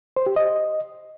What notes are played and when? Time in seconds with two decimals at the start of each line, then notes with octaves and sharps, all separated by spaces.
0.16 C5
0.26 G4
0.36 D#5